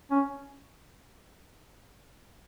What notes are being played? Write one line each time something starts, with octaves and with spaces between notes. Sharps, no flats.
C#4